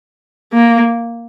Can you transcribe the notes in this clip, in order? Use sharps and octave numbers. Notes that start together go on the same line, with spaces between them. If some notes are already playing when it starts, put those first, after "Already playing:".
A#3